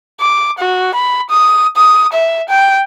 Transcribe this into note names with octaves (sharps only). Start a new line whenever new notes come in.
D6
F#4
B5
D#6
D#6
E5
G5